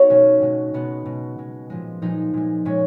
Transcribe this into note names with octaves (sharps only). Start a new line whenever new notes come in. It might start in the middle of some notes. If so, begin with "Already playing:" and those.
Already playing: B3 D#4 F#4 C#5
B2 G#3 C#4
B2 G#3
B2 G#3 B3
B2 G#3
B2 G#3
A#2 F3 G#3
A#2 F3 G#3 D#4
A#2 G#3
A#2 G#3 C#4